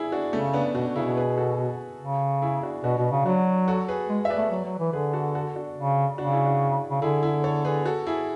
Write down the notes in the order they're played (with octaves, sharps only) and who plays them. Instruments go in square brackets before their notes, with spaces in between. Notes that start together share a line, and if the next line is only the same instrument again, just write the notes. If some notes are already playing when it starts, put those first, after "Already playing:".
Already playing: [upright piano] D4 E4 G#4
D4 F#4
[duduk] C#3 [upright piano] A3 C#4
[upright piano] B3 D4
[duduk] B2 [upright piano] D4 F#4
[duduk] C#3 [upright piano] E4 G#4
[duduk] B2
[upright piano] G#4 B4
F#4 A4
[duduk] C#3
[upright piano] E4 G#4
D4 F#4
[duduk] B2 [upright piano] D4 F#4
[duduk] B2
C#3
[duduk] F#3 [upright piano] D4 F#4
[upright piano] F#4 A4
G#4 B4
[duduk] G#3
[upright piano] E5
B4 D5
[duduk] A3
F#3
F#3
E3
[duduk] D3 [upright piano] G#4 B4
[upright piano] F#4 A4
F#4 A4
D4 F#4
[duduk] C#3
[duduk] C#3 [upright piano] D4 F#4
[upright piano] E4 G#4
D4 F#4
[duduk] C#3
[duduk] D3 [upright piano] E4 G#4
[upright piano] E4 G#4
A4 C#5
G#4 B4
F#4 A4
E4 G#4